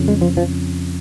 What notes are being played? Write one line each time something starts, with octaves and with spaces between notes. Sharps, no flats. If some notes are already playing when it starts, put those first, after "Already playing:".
Already playing: F2 C#3
G#3
F3
F3